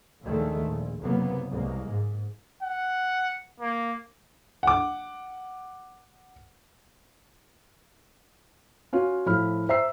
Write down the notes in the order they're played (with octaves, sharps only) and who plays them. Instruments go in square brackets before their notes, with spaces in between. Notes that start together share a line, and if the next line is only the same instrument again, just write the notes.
[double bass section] A#1 D#2 D3 D#3 G#3 A3
A#1
F#1 C3 F#3 A#3 B3
C2 G#3 A#3
G#2
[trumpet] F#5
A#3
[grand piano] F#5 D6
[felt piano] C#4 F4 F#4
A2 F3 E4 B5 F6
C5 E5 A#5 E6 C7